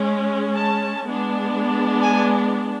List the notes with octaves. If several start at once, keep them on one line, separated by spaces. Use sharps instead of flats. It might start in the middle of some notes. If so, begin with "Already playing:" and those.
Already playing: G#3 C#4
A5
G#3 B3 D4
G#5